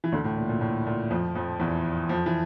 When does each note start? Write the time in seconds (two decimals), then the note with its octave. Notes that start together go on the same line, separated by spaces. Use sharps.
0.04 E3
0.12 D2 D3
0.24 A2
0.37 A#2
0.49 A#2
0.61 A2
0.87 A#2
1.10 F2 F3
1.35 F2 F3
1.60 E2 E3
2.09 F2 F3
2.26 E3